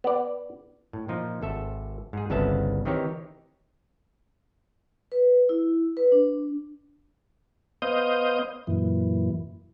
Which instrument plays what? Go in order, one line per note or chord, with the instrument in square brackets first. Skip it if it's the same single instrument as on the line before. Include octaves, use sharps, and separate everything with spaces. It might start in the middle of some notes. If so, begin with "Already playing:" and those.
[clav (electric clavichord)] B3 D5
A2
A#2 F3 D#4
G#1 A4 E5
G#2 G#4
G1 C2 C#3 B3 E5 A5
D#3 E3 C4 D#4 G4 C#5
[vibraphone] B4
E4
B4
D4
[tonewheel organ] B3 C5 D#5 F5 D#6 G6
F#2 A#2 E3